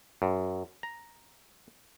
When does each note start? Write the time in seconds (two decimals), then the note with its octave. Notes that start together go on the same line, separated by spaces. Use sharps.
0.22 F#2
0.83 A#5